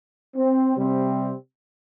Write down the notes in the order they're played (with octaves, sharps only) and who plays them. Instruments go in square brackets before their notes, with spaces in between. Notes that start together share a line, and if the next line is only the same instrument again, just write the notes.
[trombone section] C4
C3 G3 C4